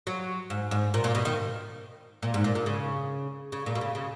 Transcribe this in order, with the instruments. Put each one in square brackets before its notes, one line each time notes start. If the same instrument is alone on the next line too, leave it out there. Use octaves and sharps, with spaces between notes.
[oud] F#3
G#2
G#2
A#2
A#2
B2
D#3
A#2
G#2
A#2
A#2
C#3
C#3
A#2
B2
C#3
C#3